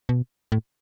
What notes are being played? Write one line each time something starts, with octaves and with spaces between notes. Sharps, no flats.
B2
A2